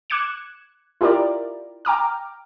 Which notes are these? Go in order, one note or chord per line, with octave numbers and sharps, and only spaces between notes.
D6 F#6 G#6 C#7 E7
E4 F4 G4 A#4 D5
G5 A#5 D6 F6